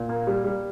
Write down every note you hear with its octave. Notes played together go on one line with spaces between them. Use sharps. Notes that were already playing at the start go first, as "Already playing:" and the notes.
Already playing: A#2
A#3
G3
G3